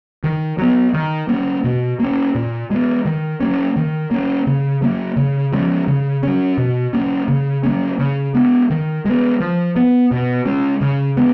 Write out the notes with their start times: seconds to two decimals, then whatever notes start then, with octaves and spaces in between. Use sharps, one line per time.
0.24 D#3
0.58 F#3 B3
0.94 D#3
1.29 A#3 C#4
1.64 B2
1.99 A#3 C#4
2.35 A#2
2.70 G#3 B3
3.05 D#3
3.41 F#3 A#3 C#4
3.76 D#3
4.11 A#3 C#4
4.47 C#3
4.82 F#3 A#3
5.17 C#3
5.53 F3 G#3 C#4
5.88 C#3
6.23 F#3 C#4
6.58 B2
6.93 A#3 C#4
7.28 C#3
7.63 F#3 A#3 C#4
7.99 C#3
8.34 G#3 B3
8.70 D#3
9.05 G#3 B3
9.40 F3
9.76 B3
10.11 B2
10.45 G#3 C#4
10.81 C#3
11.17 G#3 B3